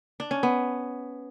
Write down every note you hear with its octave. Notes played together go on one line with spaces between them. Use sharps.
D4
C#4
B3